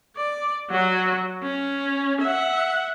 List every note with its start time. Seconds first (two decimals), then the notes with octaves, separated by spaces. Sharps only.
0.17 D5
0.70 F#3 F#4
1.43 C#4
2.22 E5 F#5